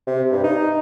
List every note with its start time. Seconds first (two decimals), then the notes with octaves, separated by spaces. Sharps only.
0.07 C3
0.32 G2
0.43 D#4